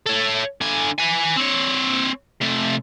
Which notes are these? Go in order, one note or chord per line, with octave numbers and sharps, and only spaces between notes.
A4 C#5
D3 G#5
B4 G#5
C4 C#5
C3 A3